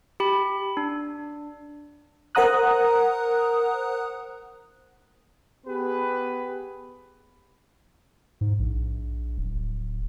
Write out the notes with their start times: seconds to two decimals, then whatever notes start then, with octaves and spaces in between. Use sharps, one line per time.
0.20 G4 B5
0.77 D4
2.35 A#4 C5 F#5 A#5 D#6 F#6
5.66 B3 G4 G#4 B4
8.41 G#2
8.59 A#1
9.38 D1